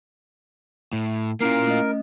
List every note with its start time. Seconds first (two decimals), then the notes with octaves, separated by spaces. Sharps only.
0.93 A2
1.41 A#3 C#4 E4 F4 A#4 C7
1.67 A3 C#4 D#5